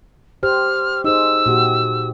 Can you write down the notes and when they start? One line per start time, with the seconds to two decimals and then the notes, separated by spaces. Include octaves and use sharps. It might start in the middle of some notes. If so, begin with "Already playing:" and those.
0.43 G4 C5 F6
1.04 D#4 G#4 C5 E6
1.46 A#2 F#4 G4